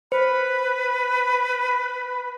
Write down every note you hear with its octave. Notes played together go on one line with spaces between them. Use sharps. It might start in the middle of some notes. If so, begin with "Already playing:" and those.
B4 C5 B5